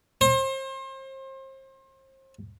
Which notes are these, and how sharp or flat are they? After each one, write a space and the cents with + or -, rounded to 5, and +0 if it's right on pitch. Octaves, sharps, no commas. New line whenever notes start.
C5 +35